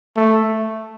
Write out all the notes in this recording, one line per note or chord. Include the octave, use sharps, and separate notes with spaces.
A3